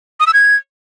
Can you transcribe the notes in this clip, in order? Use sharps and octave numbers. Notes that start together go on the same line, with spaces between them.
D#6
E6
G#6